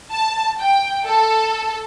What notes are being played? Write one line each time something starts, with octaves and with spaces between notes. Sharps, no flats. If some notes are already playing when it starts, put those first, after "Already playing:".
A5
G5
A4